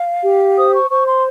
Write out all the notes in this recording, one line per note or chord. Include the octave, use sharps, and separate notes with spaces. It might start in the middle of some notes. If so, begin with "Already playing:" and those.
Already playing: F5
G4
C5 D#6
C#6
C5 C#6
C6